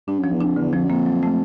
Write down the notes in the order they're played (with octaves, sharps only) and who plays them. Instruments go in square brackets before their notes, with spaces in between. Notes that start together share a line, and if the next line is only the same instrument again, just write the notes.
[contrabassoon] G2 [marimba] D4
[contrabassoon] F#2 [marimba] F3
[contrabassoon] E2
[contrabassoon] F2 [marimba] D4
[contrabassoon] E2 [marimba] D3
[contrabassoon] F2 [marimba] F3
[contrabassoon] F#2
[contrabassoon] F2 [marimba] A#3
[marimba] F#3
A3